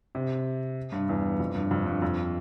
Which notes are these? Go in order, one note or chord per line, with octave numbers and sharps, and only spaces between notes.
C3
G2
E2
F2
G2
F2
G2
F2